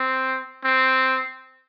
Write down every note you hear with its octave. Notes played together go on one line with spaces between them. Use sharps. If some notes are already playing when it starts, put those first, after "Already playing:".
Already playing: C4
C4